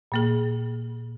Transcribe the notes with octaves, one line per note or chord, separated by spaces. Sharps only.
A#2 A#3 G#4